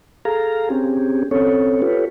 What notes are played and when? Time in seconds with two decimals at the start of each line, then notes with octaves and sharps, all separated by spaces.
0.25 G#4 A4 F5 A#5
0.70 C4 C#4 G4 G#4
1.31 C4 C#4 A4 C#5
1.82 F4 G4 A4 B4 C#5